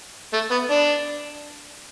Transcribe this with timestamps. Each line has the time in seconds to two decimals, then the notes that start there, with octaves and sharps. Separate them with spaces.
0.33 A3
0.51 B3
0.71 D4